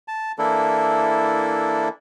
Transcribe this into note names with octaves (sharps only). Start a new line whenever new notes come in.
A5
E3 A#3 D4 E4 A4